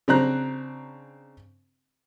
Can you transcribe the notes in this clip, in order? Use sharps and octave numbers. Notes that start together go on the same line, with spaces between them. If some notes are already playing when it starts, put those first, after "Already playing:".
C#3 C4 D4 A#5 F#6